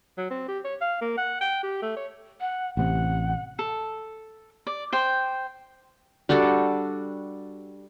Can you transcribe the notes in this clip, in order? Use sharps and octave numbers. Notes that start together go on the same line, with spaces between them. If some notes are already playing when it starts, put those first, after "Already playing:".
F#3
C4
G4
C#5
F5
A#3
F#5
G5
G4
A3
C#5
F#5
A1 C3 F#5
A4
D5
C5 G5
G3 D4 F#4 A4